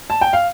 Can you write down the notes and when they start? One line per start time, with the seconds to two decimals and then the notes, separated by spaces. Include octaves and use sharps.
0.10 A5
0.21 G5
0.33 F5